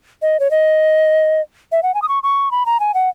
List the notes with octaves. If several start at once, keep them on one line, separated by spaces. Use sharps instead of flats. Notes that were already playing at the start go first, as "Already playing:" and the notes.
D#5
C#5
D#5
E5
F#5
G#5
D#6
C#6
C#6
B5
A#5
G#5
F#5